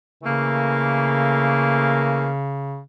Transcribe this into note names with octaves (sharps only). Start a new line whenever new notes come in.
C#3 E3 A3 A#3